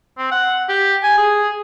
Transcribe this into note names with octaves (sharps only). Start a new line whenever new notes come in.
C4
F#5
G4
G#5
G#4